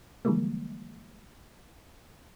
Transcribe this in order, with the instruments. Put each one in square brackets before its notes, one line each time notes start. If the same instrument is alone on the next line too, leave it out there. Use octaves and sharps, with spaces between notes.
[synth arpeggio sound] D3 E3 F3 G3 G#3 A#3